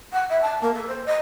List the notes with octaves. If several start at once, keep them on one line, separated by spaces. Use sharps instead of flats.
F#5
E5
A5
A#3
A4
C5
D#5